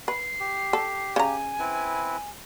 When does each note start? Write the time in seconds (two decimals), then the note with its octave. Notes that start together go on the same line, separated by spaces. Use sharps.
0.08 B4 C7
0.40 G4
0.73 A4
1.16 C#3 G#5 A#5
1.59 C4 E4 B4